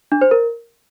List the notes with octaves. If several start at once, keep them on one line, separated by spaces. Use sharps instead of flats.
D4
C5
A#4